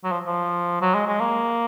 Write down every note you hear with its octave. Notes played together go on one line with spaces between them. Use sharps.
F#3
F3
F3
F#3
G#3
G#3
A#3